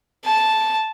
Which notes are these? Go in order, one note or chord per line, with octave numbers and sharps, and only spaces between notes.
A5